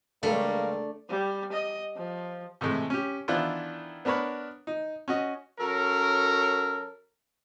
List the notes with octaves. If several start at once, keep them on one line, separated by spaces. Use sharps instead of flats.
C#2 G3 A3 A#3 D4 C#5
G3
D#5
F3
A2 C3 E3 G#3 A3
C#4 G4
D#3 E3 B3 D4 E4 F4
B3 D4 A#4 B4 C#5
D#4
C#4 F#4 D#5
F#3 C#4 A4 A#4